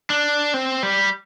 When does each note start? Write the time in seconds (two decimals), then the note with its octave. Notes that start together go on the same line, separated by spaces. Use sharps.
0.10 D4
0.54 C4
0.83 G3